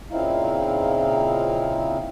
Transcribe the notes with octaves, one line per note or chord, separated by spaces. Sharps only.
A#2 C#3 C4 D#4 E4 F5